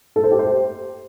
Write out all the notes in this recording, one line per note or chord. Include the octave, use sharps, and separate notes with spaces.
A4
C5
G4
C5